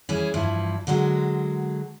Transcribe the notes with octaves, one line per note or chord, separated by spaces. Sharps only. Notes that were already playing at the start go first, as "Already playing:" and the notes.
E3 G3 C#4 G#4
G2 E3 F3 E4
D3 F#3 G#3 F#4